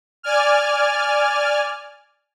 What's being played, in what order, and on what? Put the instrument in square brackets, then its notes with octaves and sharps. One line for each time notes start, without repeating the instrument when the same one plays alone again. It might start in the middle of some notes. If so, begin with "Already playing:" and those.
[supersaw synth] D5 G#5 F6